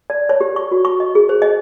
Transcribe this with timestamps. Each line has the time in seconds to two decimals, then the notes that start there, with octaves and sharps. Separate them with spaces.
0.10 D5
0.29 C#5
0.41 G4
0.56 C#6
0.72 F#4
0.85 C#6
1.00 D#5
1.15 G#4
1.29 C5
1.42 D#5